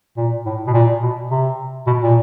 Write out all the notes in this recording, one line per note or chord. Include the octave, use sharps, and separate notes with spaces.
A#2
A2
B2
A#2
B2
C3
B2
A#2